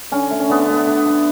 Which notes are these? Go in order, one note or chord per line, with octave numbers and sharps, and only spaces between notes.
D3 C#4
A3
C#4
D3 B3
A3 B3
D3
A3